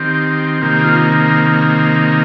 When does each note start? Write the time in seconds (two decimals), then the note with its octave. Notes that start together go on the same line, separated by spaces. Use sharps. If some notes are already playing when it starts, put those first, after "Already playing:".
Already playing: D#3 C4 G4
0.62 C3 D#3 A#3 G4
0.84 F4